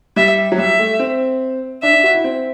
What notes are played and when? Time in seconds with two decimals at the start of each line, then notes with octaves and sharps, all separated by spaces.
0.16 G3 E5
0.52 F#3
0.58 G3 E5
0.79 A3
0.99 C4
1.82 D4 E5
1.93 D4
2.04 F#4
2.14 E4
2.24 C4